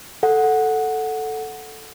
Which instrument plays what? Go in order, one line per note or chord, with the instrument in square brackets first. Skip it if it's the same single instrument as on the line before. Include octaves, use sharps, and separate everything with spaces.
[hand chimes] A4 F#5